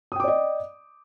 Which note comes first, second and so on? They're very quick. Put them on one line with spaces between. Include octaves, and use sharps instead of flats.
D#6 G5 D6 D5 D#5